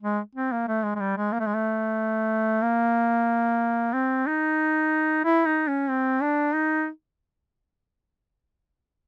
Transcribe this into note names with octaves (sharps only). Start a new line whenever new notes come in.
G#3
C4
A#3
A3
G#3
G#3
G3
G#3
A#3
A3
G#3
A3
A#3
C4
D#4
E4
D#4
C#4
C4
D4
D#4